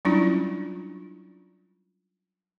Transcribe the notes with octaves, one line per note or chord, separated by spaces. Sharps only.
F#3 G3 C#4 D4 E4 F4